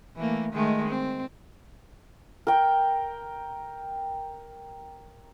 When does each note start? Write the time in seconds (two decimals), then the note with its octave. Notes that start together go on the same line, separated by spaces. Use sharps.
0.16 E3 A3 A#3
0.52 D#3 G#3 A3
0.88 C4
2.47 A#4 G5